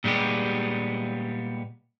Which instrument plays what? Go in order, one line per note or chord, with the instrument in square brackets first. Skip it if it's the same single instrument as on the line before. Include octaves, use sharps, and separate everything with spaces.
[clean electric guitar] A#2 G3 G#3 B3 G4